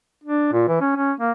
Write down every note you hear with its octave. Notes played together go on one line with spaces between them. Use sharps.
D4
A#2
E3
C#4
C#4
A#3